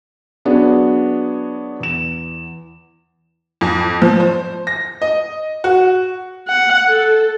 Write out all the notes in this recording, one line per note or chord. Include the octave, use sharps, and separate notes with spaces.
F#3 B3 D4 F#4 G#4
E2 E7
F2
F3
C5
A#6
D#5
F#4
F#5
A4